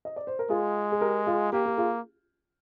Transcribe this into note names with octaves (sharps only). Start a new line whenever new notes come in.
D#5
D5
C5
A#4
G#3 F4 G#4
G#4
G4 A#4
F4 G#4
A#3 G4
G4
F4 G#4